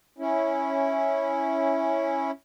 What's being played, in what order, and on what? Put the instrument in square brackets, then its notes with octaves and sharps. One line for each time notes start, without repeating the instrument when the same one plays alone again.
[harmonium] C#4 E4